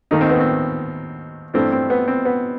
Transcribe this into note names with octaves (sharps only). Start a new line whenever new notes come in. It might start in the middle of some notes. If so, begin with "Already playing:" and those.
D#2 D#3 A3 D#4
C4
B3
C4
G2 E3 A3 C4
C4
B3
C4
B3